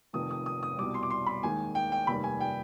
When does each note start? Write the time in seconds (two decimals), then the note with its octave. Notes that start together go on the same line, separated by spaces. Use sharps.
0.13 F1 F2 D#3 D#6
0.31 D#6
0.46 D#6
0.63 D#6
0.78 C2 B2 G3 D6
0.94 C6
1.03 D6
1.10 C6
1.26 B5
1.43 D#2 D#3 G#3 G#5
1.75 G5
1.92 G5
2.07 F1 D#2 D#3 G3 B5
2.24 G#5
2.40 G5